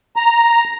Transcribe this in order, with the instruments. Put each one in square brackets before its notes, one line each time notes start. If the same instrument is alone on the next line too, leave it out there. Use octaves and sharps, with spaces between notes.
[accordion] A#5